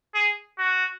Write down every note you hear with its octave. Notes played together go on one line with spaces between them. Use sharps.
G#4
F#4